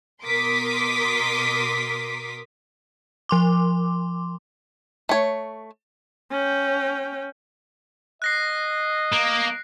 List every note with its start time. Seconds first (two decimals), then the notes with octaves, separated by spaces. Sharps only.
0.23 B2 A#4 C6 D6 D#6 B6
3.29 F3 C6 D6
5.09 A3 C#5
6.31 C#4 G5
8.22 D#5 F#6 A#6 C7
9.12 A#3